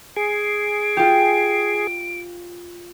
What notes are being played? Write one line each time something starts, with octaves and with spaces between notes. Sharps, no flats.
G#4 D7
F4 G4